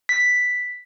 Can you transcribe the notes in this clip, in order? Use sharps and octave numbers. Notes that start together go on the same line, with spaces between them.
B6